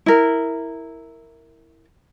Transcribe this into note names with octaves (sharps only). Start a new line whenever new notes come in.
E4 A#4